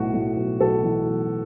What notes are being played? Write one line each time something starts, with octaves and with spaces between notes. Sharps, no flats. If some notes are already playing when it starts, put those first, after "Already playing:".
Already playing: B1 A2 F#4
A2
B1
B1 A4
E3
B1